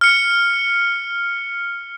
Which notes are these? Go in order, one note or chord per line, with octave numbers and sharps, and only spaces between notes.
F6 C#7